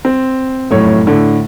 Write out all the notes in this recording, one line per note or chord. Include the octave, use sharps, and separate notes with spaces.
C4
F1 F#2 A2 C#5
A2 D3